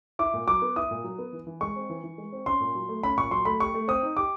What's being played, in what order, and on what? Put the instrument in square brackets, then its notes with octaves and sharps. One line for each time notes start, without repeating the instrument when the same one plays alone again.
[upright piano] E4 [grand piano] D6
[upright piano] A#2
[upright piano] F#3 [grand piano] D6
[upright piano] B3
[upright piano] E4 [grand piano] D#6
[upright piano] A#2
F#3
B3
E3
E3
[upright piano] G#3 [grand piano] C#6
[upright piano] C4
E3
E3
G#3
C4
[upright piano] C#4 [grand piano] C6
[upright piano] A#2
F#3
A3
[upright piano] C#4 [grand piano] B5
[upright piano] A#2 [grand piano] C#6
[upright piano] F#3 [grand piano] C6
[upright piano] A3 [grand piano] B5
[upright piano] G4 [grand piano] C#6
[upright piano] A3
[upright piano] C4 [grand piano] D#6
[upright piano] D#4
[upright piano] G4 [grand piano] D6